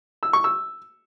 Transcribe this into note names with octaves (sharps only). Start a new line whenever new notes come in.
E6
C#6
E6